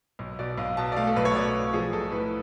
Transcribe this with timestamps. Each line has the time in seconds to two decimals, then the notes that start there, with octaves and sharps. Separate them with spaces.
0.19 B1
0.39 B2 D5
0.58 B1 F5
0.77 B2 A5
0.92 D5
0.96 A3 F5
1.07 A4
1.16 B1 B4
1.25 C#5
1.35 B2 D5
1.54 B2
1.73 F3 G#4
1.93 B1 A4
2.12 A2 B4